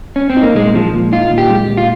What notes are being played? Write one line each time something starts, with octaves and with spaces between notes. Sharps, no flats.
C#4
C4
D#4
A#3
A#2 G#3
F3 G#3
A#2
D#4 F4
A#2
G4
G#3
A#2
F4